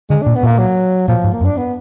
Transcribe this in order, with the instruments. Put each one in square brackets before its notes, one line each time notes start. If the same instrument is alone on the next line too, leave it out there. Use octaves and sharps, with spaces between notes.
[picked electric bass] D3 [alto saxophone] G#3
[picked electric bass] A#2 [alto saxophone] D4
[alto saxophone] B3
[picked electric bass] A#2 [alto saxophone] A#3
[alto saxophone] F#3
[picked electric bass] A#2 [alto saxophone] F3
[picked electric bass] G#2
[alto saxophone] A#3
[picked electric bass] F#2
[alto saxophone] D4
B3